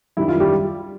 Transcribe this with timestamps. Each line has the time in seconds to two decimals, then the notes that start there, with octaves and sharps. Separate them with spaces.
0.17 F#2 D#3 G3 E4
0.28 F4
0.40 G3 G4